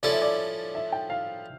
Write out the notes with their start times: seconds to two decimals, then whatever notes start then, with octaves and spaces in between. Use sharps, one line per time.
0.03 F3 C#4 E4 A4 D5
0.12 E5
0.22 D5
0.75 E5
0.92 G5
1.10 F5